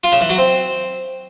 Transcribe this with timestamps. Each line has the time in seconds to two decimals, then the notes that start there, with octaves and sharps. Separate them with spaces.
0.04 F4
0.12 C#3
0.21 E3
0.29 F#3
0.38 C4